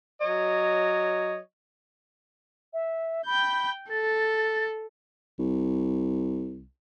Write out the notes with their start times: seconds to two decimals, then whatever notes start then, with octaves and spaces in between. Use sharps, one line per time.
0.20 F#3 C#5 D#5
2.73 E5
3.26 G5 B5 G6
3.90 A4 A6
5.39 C2